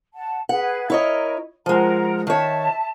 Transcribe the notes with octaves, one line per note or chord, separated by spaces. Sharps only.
F#5 A5
G#4 B4 F#5
E4 A#4 C#5 D#5
F3 G#3 A#4 F#5 A#5
D#3 C#5 E5 A5